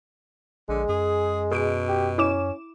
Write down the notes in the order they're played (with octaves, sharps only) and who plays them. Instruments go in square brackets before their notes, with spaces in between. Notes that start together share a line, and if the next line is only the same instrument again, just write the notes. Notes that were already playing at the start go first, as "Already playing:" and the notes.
[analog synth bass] A#1 [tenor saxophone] D3 [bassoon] G#3
[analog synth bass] F#2 [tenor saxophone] G#4
[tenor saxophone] B2 [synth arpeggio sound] G#4 D7
[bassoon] G4
[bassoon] C#4 [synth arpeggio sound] E4 D6 E7